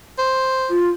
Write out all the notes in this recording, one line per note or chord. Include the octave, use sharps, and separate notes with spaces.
C5
F4